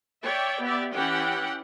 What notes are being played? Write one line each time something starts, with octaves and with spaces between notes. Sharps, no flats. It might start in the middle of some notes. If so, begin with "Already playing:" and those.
C#5 D5 E5 G5
B3 G4 D5 E5
E3 C#4 G4 F#5 G5